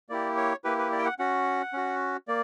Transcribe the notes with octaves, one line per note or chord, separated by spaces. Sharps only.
A#3 E4 G4 D5
C#5
A#3 E4 G4 B4
B4
D5
G5
F#5
C#4 F#4 F#5
C#4 F#4
A#3 D5